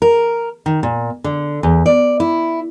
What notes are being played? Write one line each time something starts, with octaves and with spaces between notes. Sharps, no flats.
A#4
D#3
A#2
D3
E2
D5
E4